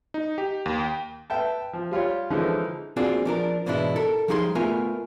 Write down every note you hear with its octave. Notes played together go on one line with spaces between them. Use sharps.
D#4
G4
D#2
G5
B4 E5 G5 A5
F3
G3 F4 G4 C#5
D3 E3 F3 G#3 C#4 D#4
A#3 C4 D4 F4 F#4 G#4
F3 D4 A#4
G#2 B2 E3 G#3 D4 E4
A4 A#4
F3 G3 D#4 G#4 F#5 C6
A3 B3 F4 A#4 E5 G#5